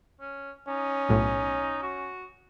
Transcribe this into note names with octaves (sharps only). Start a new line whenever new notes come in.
C#4
C#4 D#4
B1 A2
F#4